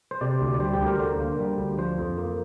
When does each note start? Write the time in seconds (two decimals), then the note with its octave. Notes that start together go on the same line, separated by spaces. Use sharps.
0.11 C5
0.21 C3 D5
0.41 D2
0.54 D5
0.60 G3 C5
0.73 G4
0.81 D2
0.87 A#4
0.99 D3 C5
1.20 A#3
1.39 G3
1.58 D2
1.78 F3 C5
1.98 F2
2.18 A#3